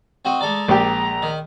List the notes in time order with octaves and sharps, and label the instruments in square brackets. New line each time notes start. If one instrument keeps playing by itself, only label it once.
[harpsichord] C4 F#4 D#5
[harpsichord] G#3 A4 D5 [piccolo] A#5
[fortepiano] A#1 G4 [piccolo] A#5
[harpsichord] D#3